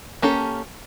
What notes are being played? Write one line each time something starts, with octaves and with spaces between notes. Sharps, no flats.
A#3 C#4 G4 A4